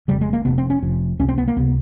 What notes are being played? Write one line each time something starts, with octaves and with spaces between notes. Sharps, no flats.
F#1 F2 C#3 G3
G#3
A#3
F1 F2 C3 B3
C4
C#4
F1 F2 C3
C#2 C3 C#4
C4
B3
A#3
C#2 C3 B3